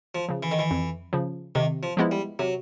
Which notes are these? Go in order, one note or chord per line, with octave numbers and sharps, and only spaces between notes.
F3
C#3 F3
E3
D#3
E3
F2
C#3 F3
C3 D#3
F3
F3 G#3 B3 E4
G3
C3 F#3